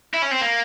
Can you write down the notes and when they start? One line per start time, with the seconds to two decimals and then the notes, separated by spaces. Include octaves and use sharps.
0.14 E4
0.22 C#4
0.31 C4
0.41 A#3